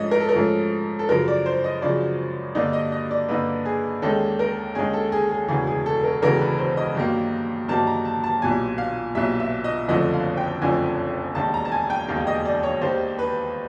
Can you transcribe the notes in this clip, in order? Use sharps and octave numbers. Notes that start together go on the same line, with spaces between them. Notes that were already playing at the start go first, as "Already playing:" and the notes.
Already playing: G#2 F3 A3 C#4 D#5
A#4
A4
A#4
G#2 F3 A3 C#4
A4
F#2 C#3 F3 A#4
D5
C5
D#5
F#2 C#3 F3 D5
G2 D3 G3 A#3 D#4 D5
D#5
D#5
D5
G2 D3 G3 A#3 D#4 B4
G#4
D#2 D#3 G#3 C#4 A4
A#4
D#2 D#3 G#3 C#4 G#4
A4
G#4
G#4
E1 D2 C#3 E3 G#4
G#4
A4
A#4
E1 D2 C#3 E3 A#4
B4
C5
D#5
G2 D#3 F#3 A#3
G2 D#3 F#3 A#3 A5
A#5
A5
A5
B1 A#2 G3 G#5
F5
B1 A#2 G3 E5
E5
D#5
F#1 F2 D3 F3 A3 D#5
F5
G5
F#1 F2 D3 F3 A3 G#5
E1 D#2 D#3 A5
A#5
A5
G#5
G5
E1 D#2 D#3 F5
D#5
D5
C#5
D#2 D#3 G3 C5
B4